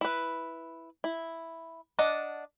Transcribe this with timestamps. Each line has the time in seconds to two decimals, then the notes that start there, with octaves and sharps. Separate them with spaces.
0.01 E4 B4
1.04 E4
1.99 D4 D#5 F#5 A5